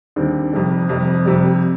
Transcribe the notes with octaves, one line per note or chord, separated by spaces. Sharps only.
D#2 D3 G3 C4
F2 C3 G3
F2 C3 G3
F2 C3 G3